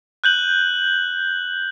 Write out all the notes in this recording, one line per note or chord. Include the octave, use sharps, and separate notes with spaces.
F#6 G6 F#7